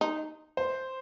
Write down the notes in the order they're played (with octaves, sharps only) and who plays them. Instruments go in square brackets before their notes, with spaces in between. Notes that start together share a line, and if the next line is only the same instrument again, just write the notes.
[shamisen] D#4
[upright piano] C5